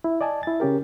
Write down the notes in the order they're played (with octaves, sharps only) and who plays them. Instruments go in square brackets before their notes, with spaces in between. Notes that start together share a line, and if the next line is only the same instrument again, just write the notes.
[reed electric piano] E4
D5 D#5 G#5 A5
E4 A6
C#3 C#4 G4 A#4